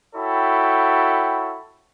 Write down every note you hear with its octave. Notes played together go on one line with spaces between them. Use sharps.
E4 F#4 A4 C#5 G5 B5